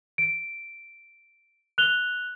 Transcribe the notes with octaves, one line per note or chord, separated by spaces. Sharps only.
D7
F#6 F7 G7